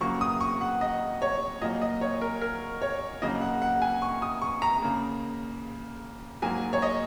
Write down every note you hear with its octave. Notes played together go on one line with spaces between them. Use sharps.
C#3 F#3 A#3 C#6
D#6
C#6
F#5
D#5
C#5
A#2 F#3 A#3 D#5
D#5
C#5
A#4
A#4
C#5
C#3 F#3 A#3 D#5
F#5
F#5
G#5
C#6
D#6
C#6
A#5
C#3 A#3
G#2 F#3 A#3 G#5
C#5
D#5